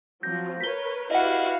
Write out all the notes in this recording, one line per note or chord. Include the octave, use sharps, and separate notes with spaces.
F3 F#3 C4 G6 A#6
A#4 B4 C#5 B6 G7
E4 F#4 G4 B4 D#5 F5 F#5